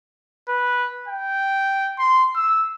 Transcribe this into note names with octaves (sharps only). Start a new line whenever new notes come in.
B4
G5
C6
E6